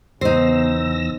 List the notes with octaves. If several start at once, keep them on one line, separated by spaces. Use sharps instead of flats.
E2 C#3 B3 D#4 C5 E6 A#6